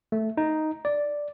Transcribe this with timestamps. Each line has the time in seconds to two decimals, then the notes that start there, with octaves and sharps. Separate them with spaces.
0.12 A3
0.37 D#4
0.85 D5